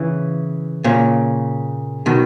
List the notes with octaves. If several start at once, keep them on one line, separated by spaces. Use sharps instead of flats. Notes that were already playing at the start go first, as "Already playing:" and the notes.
Already playing: C#3 E3
A#2 C#3
B2 D#3